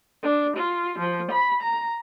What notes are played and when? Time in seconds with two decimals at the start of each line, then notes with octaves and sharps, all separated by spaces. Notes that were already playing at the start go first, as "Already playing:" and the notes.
0.23 D4
0.56 F4
0.99 F3
1.31 B5
1.61 A#5